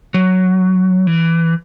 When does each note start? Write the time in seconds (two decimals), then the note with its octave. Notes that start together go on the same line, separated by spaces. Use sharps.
0.14 F#3
1.07 E3